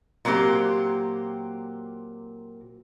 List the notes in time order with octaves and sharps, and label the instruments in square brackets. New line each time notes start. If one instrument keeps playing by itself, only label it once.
[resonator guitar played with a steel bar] A#2 F#3 A#3 C4 G4